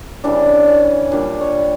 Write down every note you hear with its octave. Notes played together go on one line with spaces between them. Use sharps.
C#3 E3 G3 D4
C#4
A#2 G3 D4
C#5